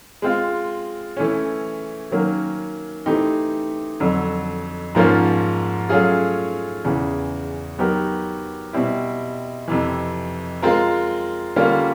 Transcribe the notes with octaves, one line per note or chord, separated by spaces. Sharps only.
G#3 C4 F4
E3 A3 C#4
D#3 F#3 A#3 C#4
E3 A3 C4 D#4 G4
F2 D3 F#3
G#2 F3 A#3 C#4 F4
F#3 A3 C#4 F4 G#4
E2 C#3 E3
F#3 B3 D#4 G4 A#4
B2 G3 C4 E4
F2 C3 E3
G#3 C4 F4 A#4
D3 G3 A#3 C#4 F4